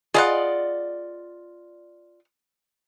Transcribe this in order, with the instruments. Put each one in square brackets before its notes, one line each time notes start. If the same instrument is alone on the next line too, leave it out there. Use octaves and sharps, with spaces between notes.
[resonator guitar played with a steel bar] F4 D5 D#5 [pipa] G#4 F5 F#5